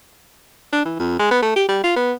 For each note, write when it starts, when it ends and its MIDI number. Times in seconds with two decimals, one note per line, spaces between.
0.72 0.85 62
0.85 0.97 52
0.99 1.15 41
1.19 1.30 56
1.31 1.41 59
1.42 1.55 57
1.56 1.64 67
1.68 1.83 55
1.84 1.94 65
1.96 2.12 59